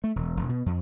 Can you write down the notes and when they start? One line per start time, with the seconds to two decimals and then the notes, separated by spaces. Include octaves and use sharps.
0.04 A3
0.16 E1
0.37 E1
0.49 B2
0.66 F2